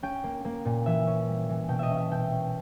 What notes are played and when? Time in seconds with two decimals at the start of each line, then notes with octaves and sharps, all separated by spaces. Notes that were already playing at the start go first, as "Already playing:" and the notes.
0.03 C#4 G5
0.24 A#3
0.45 A#3
0.65 A#2
0.86 E3 E5
1.07 C#4
1.28 G3
1.49 E3
1.68 B2 G5
1.79 D#5 E5
1.91 C#4
1.97 E5
2.11 B2 G5
2.32 C#4